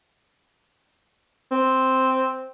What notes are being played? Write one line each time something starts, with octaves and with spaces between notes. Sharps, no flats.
C4